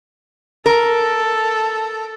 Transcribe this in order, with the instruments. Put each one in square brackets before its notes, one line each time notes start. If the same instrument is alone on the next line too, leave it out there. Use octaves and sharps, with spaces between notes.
[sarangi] A4 [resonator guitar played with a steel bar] A#4